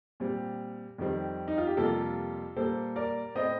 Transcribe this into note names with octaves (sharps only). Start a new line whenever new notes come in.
A#2 G3 C4
F2 D#3 G3 C4
D#4
F4
G4
F2 C3 G3 A#3 F4 A4
A#2 G3 A#3 A4 C5
A#4 D5
A2 A3 C4 C5 D#5